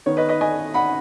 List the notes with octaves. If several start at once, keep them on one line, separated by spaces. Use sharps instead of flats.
D#3 B3 C#5
B4 D#5
B4 D#5
D#5 G#5
F#5 B5